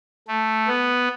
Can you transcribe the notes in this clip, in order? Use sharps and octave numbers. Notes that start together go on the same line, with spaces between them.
A3
B3